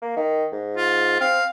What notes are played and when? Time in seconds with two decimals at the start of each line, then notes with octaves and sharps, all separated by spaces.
0.02 A#3
0.17 D#3
0.52 G#2
0.77 F4
1.20 C4 F5